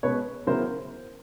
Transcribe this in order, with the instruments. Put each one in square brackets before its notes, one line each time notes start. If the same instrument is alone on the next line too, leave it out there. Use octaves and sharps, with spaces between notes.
[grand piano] B2 G#3 C#4 [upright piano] B4 C#5
[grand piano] C#3 F#3 B3 E4 [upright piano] A#4 C5